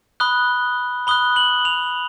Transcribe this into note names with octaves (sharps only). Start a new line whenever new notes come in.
B5 D#6 F#6 G7
B5 D#6 F#6 G7
F#7
F7